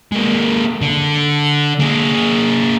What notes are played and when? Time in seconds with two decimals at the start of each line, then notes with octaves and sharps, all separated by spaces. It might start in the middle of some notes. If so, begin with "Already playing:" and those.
0.12 G#3 A#3
0.82 D3
1.80 A#3 G#4